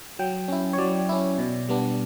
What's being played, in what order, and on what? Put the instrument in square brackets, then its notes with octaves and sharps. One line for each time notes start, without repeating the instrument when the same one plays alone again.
[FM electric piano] F#3 G5
C#4 E4
C#5
F#3 D5
C#4 E4
B2
G3 B3 D4